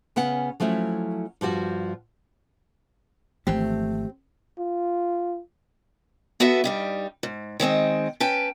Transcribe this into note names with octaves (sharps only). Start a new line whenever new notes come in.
C#3 B3 C#4 F#5
F3 F#3 A3 C#4 E4
G2 F3 G3 F#4
G#1 E3 F3 A3 C4 G4
F4
B3 F#4 A4 B4 E5
G2 G3 D#4
G#2
D#3 G#3 C4 D#5
C#4 B4 G5 A5